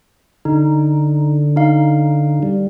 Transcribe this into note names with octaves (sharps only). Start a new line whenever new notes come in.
D3 D#4
D#4 F5
G3